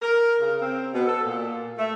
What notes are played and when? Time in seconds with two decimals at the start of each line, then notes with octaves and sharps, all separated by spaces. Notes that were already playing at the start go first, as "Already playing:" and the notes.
0.02 A#4
0.40 C#3
0.61 C4
0.93 B2
1.06 A4
1.24 A#2
1.78 A3